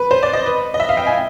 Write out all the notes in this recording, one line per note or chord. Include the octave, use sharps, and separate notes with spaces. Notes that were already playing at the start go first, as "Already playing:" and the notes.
Already playing: B4
C5
D5
D#5
B4
D#5
E5
F5
G5
G#5